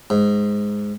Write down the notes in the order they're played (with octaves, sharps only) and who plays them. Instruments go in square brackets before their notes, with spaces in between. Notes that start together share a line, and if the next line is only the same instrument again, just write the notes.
[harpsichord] G#2